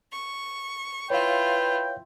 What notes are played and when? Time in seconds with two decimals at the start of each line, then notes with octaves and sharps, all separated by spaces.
0.12 C#6
1.10 E4 F4 B4 C#5 F5 G5